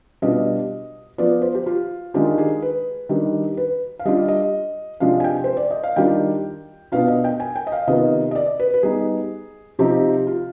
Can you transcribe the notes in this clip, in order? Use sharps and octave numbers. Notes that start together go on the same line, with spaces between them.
B2 G3 B3 D4 F4 D#5
F3 B3 F4 D5
C5
G4
F4
D#3 G#3 D4 F4 G4
G#4
B4
D#3 G3 D4
B4
F5
G3 D4 F4 D#5
D#5
C3 F3 G#3 D4 F4 F5
G#5
G5
C5
D5
D#5
F5
D#3 G3 D4 F4 G5
B2 B3 D4 F4 F5
D#5
G5
G#5
G5
D#5
F5
C3 D#3 B3 F4 D#5
D#5
D5
B4
B4
G3 B3 D#4 G#4
C3 F3 C4 D#4 G4
F4